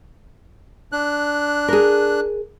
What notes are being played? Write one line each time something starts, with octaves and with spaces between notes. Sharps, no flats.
D4 F#6
G#4 A#4